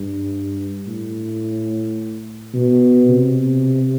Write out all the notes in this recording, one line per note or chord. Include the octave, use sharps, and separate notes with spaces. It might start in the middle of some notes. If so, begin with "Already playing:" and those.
Already playing: G2
A2
B2
C3